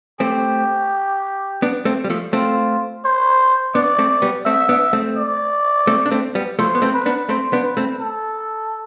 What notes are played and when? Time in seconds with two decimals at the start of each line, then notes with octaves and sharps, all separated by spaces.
0.20 A3 C4 G4
1.62 B3 D4
1.85 A3 C4
2.04 G3
2.10 F3 A3
2.33 A3 C4 F4
3.05 C5
3.75 B3 D4 D5
3.99 A3 C4
4.22 G3 B3
4.46 A3 C4 E5
4.69 B3 D4
4.93 A3 C4
5.17 D5
5.87 A3 C4
6.06 D4
6.12 A3 C4
6.35 G3 B3
6.59 F3 A3 C5
6.75 B3
6.82 A3 C4
6.94 B4
7.06 B3 D4
7.29 A3 C4 C5
7.53 B3 D4
7.65 B4
7.77 A3 C4
8.00 A4